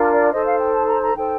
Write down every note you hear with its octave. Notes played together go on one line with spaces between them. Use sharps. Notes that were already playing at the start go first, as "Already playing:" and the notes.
Already playing: D4 F4 A#4
D5
D#4 A4 C5 D#5
F5
G5
A5
A#5
A#5
D#4 A4 C5 G5